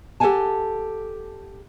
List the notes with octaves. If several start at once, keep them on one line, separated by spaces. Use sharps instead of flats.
G4 A4 A#4 F#5 G#5 A5